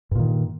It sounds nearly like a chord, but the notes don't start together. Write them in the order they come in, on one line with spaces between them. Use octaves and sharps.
G2 A#2 D#3